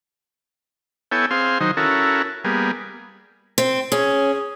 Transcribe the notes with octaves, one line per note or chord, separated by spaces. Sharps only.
B3 E4 A4 C#5 G5 G#5
C4 G#4 F5 C6
D#3 F#3 D#4 C5
C#4 E4 F#4 A4 A#4
G3 A#3 B3 G#4
C4
C#4 G#4